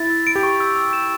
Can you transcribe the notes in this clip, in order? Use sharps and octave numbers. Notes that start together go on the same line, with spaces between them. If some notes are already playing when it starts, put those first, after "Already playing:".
Already playing: E4 A6
E6
D7
G4
C#6
E6
E6
E7